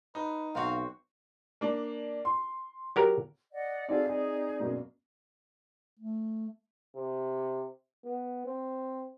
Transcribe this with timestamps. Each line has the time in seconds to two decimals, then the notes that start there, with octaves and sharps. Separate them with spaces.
0.15 D#4 B4
0.55 B1 C4 F#4 F5
1.61 A#3 D4
2.25 C6
2.96 F#3 G4 A#4
3.52 D5 D#5 F#5
3.89 C4 D#4 F#4 G#4 A4 D5 F5 G#5
4.07 D#4 G#4 G#5
4.60 F#2 B2 A#3
5.99 A3
6.95 C3
8.05 B3
8.46 C4